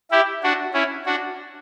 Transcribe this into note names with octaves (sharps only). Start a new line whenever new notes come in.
E4 G4
D4 F#4
C#4 E4
D4 F#4